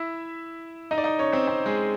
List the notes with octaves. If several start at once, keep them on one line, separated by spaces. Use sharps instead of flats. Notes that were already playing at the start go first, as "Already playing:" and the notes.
Already playing: E4 E5
D#4 D#5
D5
D#4 D#5
C#4 C#5
C4 C5
C4 C5
G#3 G#4